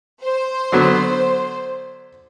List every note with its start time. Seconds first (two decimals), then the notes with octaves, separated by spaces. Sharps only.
0.24 C5
0.72 D3 F#3 B3